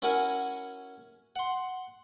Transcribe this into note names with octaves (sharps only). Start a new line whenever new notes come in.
C#4 E4 F#4 A#4 F#5 G#5
F#5 C6